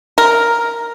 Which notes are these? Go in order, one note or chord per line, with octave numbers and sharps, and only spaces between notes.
A#4